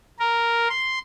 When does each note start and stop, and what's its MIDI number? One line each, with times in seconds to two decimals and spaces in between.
0.19 0.68 70
0.69 0.99 84